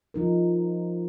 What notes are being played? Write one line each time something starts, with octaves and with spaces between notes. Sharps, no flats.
F3 D#4 A#4